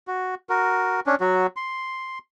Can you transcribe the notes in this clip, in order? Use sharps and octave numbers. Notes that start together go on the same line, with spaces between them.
F#4
F#4 A#4
C#4 D4
F#3 F#4
C6